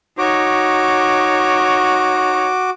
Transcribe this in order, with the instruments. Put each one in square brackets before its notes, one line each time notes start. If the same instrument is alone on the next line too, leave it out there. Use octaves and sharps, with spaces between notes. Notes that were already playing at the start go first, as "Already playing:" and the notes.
[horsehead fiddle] D#4 C#5 [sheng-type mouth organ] F#4 D6